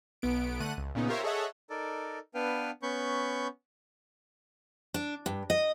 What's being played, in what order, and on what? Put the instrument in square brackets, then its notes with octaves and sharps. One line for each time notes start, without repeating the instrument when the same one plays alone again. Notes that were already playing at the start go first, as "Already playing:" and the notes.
[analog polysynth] B1 B3 D7
D3 A3 F#5 F#6 D#7
C#2
A#2 C#3 B3 D#4
F4 G4 A#4 C5 C#5 E5
G#4 A4 C#5 D#5 E5 F#5
[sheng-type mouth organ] D#4 A4 A#4 D5
B3 D4 B4 F5 G5
B3 C#4 B5 C#6 G6
[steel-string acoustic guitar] D4
G2
D#5